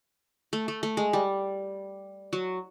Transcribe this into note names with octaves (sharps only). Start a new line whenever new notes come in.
A3
A3
A3
G#3
G3
F#3